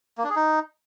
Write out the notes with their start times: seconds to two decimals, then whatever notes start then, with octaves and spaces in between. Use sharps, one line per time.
0.18 A#3
0.24 D4
0.30 G#4
0.36 D#4